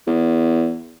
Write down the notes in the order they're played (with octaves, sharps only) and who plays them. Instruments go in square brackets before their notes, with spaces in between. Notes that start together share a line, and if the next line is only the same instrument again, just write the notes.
[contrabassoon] E2